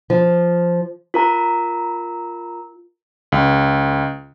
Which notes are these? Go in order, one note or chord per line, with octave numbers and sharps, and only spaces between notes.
F3
F4 A#4 A#5
C#2